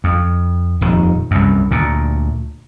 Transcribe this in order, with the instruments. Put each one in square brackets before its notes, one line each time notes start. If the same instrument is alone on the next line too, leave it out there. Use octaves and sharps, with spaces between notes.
[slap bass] F2
D#1 F2 D#3
C2 F#2
D2 A#2